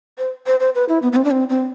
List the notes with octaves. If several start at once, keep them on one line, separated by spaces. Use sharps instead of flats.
C5
C5
C5
B4
E4
B3
B3
C4
D4
C4
C4